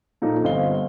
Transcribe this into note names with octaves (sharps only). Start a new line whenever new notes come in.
A#2 F3 D#4 A4
G1 C4 D#5 F5 G7